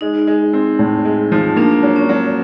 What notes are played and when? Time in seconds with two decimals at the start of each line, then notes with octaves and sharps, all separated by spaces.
0.01 G#3 D#4
0.27 G#3
0.53 C4
0.79 A2
1.05 G#3
1.32 F3
1.56 A#3 D4
1.83 F#3
1.96 C#4
2.09 F#3